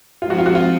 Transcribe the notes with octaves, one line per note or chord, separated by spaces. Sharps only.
F3 G#3 C4 D#4 F4
F#4
F4
F#4
F4